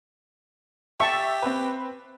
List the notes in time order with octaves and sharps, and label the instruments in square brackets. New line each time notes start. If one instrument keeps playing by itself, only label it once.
[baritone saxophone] G4 [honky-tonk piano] E5 [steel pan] A5 C#6
[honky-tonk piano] C4 B4